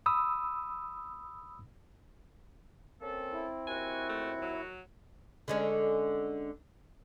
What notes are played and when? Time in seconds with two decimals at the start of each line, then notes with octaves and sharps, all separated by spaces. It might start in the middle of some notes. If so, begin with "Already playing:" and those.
0.06 B5 D#6 E6
3.01 A#3 C4 C#4 A4
3.32 E4
3.67 D#2 F#4 G#5
4.09 A3
4.42 F#3
5.48 D3 G#3 C#4